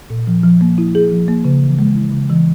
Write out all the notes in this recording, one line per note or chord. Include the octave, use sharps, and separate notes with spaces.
A#2
F3
F3
A#3
E4
G#4
F3
A#3
C#3
E3
G#3
E4
C#3
E3